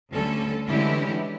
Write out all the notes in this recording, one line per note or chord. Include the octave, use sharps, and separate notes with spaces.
D2 D3 G3 C#4 A4
D3 E3 G#3 C#4 E4 G4